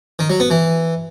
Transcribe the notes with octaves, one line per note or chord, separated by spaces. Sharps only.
D#3
F#3
B3
E3